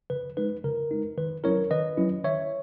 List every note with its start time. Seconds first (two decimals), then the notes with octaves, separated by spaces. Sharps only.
0.10 C#3 B4
0.37 G#3 D#4 B4
0.64 C#3 A#4
0.91 G#3 D#4
1.18 D#3 B4
1.44 F#3 C#4 E4 A#4 C#5
1.71 D#3 B4 D#5
1.97 F#3 C#4 E4
2.24 D#3 C#5 E5